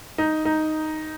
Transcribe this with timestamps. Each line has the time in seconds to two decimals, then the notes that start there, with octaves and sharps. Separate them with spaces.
0.18 D#4
0.45 D#4